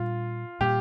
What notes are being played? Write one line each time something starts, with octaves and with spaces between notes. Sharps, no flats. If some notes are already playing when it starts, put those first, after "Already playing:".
Already playing: A#2 G3 D4 F4
A#2 G3 A#3 G4